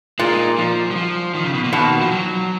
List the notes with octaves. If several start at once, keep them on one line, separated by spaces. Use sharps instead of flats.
A#2 G#3
D#4
F3
F#3
F3
D#3
C#3
B2
A#2
B2 D#3
F3
F#3